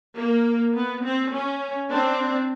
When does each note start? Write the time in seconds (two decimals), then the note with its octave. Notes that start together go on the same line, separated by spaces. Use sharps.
0.19 A#3
0.75 B3
1.04 C4
1.33 C#4
1.91 C4 D4